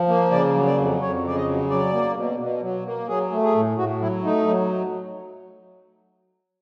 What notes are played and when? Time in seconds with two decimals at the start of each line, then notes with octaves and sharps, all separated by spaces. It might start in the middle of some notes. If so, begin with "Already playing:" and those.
Already playing: F3
0.08 A#3
0.31 C#3 D5
0.55 F#3
0.66 D5
0.77 F2
1.01 F2 C#5
1.23 C#3 D5
1.35 D#5
1.47 F#3
1.70 F#3 D5
1.93 A#3
2.15 B2
2.39 B2
2.62 F#3
2.85 A#3
3.08 F#3 G#4
3.32 A3
3.43 G#4
3.54 A2
3.78 A2 F#4
4.01 F#3 E4
4.23 A3 D#4
4.47 F#3